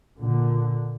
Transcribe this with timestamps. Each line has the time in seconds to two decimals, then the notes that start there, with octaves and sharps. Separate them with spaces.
0.19 A#2 D3